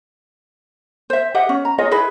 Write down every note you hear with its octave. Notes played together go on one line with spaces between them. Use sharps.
C5 E5
G4 D#5 E5 F#5
C#4
A#5
F4 G#4 C#5 D#5
E4 G#4 B4 B5